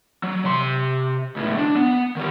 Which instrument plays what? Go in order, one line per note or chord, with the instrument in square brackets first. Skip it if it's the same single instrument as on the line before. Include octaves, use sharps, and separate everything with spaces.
[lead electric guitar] F#3
C3 C6
C#2 A2
D4
B3
D#3 G3